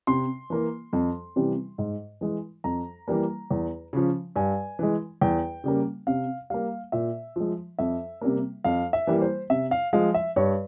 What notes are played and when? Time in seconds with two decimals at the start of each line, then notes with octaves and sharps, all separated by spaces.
0.07 C3 C6
0.50 E3 A#3
0.93 F2
1.36 C3 E3 G3
1.78 G#2
2.21 E3 G#3
2.64 F2 A#5
3.08 E3 G3 A#3
3.51 E2
3.93 C#3 F3
4.36 G2 G#5
4.79 E3 G#3
5.21 E2 G5
5.64 C#3 G3 A#3
6.07 C3 F5
6.50 G3 A#3 F5
6.92 A#2 E5
7.36 F3 G#3
7.79 F2 E5
8.21 C3 G3 A#3
8.64 F2 F5
8.93 E5
9.07 E3 G3 A#3
9.21 C5
9.50 C3 E5
9.71 F5
9.93 F3 G#3 F5
10.14 E5
10.36 G2 C#5